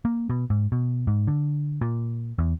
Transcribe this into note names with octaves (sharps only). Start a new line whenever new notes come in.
A#3
B2
G#2
B2
G#2
D3
A#2
E2